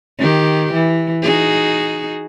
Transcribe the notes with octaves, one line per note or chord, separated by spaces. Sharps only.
D#3 G4
E3
D#4 F#4 G#4